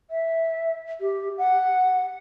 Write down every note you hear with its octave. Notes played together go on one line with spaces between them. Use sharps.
E5
G4
F#5